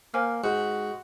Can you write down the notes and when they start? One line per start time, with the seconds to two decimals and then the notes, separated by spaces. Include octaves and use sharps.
0.14 A#3 C5 G#5 F6
0.44 G#2 F#4